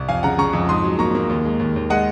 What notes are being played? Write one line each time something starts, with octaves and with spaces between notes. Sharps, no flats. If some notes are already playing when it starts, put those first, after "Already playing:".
Already playing: C2
F2 F5 G#5
C#3 F#5 A#5
C#3 A#5 C#6
F2
G#2 C6 D#6
F#3
A#3 A#5 C#6
A#3
D#2
G#3
D#2
D#2
G#3 D#5 F#5